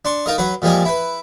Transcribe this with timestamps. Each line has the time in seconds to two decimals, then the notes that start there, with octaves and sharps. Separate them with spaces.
0.05 D4 C6 C#6
0.26 D#4 F4 A#4 D#5
0.38 F#3 B4 F#5
0.62 A#2 F3 G3 G#3 G#5
0.85 E4 B4